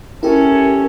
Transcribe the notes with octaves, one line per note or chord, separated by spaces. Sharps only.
C#4 E4 G4 A4 A#4